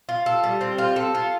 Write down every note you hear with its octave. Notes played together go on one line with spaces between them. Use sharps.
F4
A4
G3
C4
F4
A4
F4